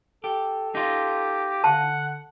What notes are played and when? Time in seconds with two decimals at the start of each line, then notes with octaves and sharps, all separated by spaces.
0.24 G4 A4
0.75 D#4 F4 G4
1.64 D3 F#5 A5